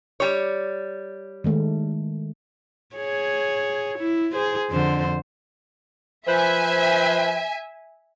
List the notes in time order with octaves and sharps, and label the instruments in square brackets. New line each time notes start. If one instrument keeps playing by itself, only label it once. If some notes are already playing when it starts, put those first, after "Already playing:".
[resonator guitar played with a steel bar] G3 C#5
[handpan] D#3 G#3 A3
[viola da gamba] G#4 C#5
E4
G#4 C5
F2 D3 C5
[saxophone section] F3 B4 C5 [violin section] E5 G#5